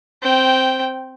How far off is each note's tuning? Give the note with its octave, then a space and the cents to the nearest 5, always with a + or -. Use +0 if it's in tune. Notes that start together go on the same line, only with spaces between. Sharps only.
C4 +0 G5 -10